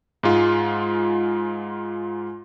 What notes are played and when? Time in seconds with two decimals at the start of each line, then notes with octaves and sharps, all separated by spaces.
0.23 G#2 G#3 F4